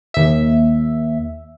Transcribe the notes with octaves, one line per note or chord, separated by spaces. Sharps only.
D#2 E5